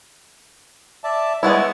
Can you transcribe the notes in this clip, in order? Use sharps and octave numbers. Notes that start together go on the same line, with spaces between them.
D5 E5 A5
G#3 B3 E4 C#5 E6